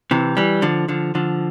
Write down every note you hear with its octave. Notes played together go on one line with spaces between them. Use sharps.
C3 E3
E3 G3
D3 F3
D3 F3
D3 F3